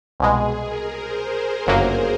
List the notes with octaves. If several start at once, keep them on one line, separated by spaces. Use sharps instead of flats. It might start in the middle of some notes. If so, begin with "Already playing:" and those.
C2 B2 G#3 G#4
A#4
C5
G1 F#2 C#3 F#3 A#3